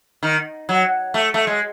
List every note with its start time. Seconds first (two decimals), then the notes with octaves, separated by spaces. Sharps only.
0.23 D#3
0.69 F#3
1.14 A3
1.34 A3
1.47 G#3